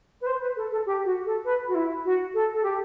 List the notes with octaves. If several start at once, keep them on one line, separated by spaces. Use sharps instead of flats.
B4
C5
B4
A4
A4
G4
F#4
A4
B4
F#4
E4
F#4
A4
A4
G4